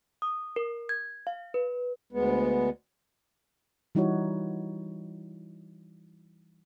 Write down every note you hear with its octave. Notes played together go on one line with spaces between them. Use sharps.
D#6
A#4
G#6
F5
B4
D2 G#3 B3
E3 G3 D#4 E4 F#4 C#5